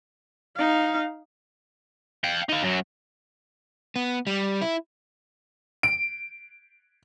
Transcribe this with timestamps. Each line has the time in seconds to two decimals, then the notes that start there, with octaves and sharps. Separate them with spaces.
0.57 D#4 F5
2.24 F5 G5
2.49 D#4 F5
2.63 F#2 F#3
3.96 B3
4.27 G3
4.62 E4
5.83 D7